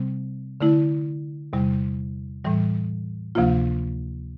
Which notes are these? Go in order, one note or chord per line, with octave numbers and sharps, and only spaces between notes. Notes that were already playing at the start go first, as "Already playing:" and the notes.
Already playing: C3 G3 C4
D3 A3 E4
E2 C3 G3
A2 E3 G3
D2 C3 F3 A#3 F4